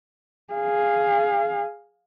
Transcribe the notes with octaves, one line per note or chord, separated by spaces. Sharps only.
G#4 F5